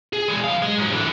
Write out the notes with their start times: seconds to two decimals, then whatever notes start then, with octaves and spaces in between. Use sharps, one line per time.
0.13 G#4
0.28 E3 G#3
0.44 F#3 F5
0.62 G#3
0.78 G#2 F#3
0.92 D3 E3